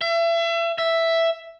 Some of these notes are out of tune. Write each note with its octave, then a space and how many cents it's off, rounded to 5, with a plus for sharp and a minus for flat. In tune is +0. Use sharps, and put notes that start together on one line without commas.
E5 +35
E5 +5